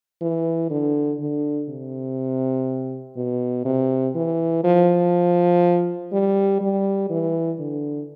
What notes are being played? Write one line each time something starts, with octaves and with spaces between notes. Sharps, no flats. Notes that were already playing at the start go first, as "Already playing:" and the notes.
E3
D3
D3
C3
B2
C3
E3
F3
G3
G3
E3
D3